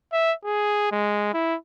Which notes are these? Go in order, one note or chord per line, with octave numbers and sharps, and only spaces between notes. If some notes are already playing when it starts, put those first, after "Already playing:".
E5
G#4
G#3
E4